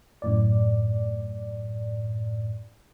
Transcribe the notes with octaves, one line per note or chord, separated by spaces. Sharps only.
F#2 A2 D5